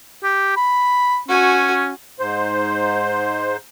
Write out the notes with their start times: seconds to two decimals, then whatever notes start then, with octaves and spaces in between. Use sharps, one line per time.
0.23 G4
0.57 B5
1.28 C#4 F#4 G#5
2.20 G#2 C5